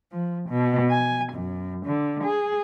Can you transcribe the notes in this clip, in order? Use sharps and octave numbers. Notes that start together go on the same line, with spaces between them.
F3
B2
G#5
F#2
D3
G#4